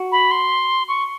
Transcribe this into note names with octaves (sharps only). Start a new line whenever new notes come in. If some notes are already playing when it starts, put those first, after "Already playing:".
Already playing: F#4
B5
C6
C#6